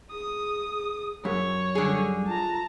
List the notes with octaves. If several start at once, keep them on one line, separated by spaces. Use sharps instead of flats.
G#4 D#6
F#2 C#5
D3 G3 G#4
F4 A5 A#5